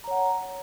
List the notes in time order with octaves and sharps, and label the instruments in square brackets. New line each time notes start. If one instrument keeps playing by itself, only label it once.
[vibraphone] A#5
C#5
F#5